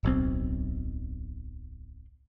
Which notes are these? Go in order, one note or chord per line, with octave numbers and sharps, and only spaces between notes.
D1 B1 C4